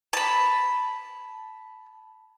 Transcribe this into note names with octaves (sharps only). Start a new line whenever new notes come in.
A5 B5